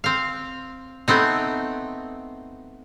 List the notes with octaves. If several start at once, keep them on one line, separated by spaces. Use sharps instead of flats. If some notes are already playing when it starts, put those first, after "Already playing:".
C4 F5
A3 B3 C4 D#4